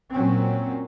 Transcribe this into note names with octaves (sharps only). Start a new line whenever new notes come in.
A#2 F#3 C4 C#4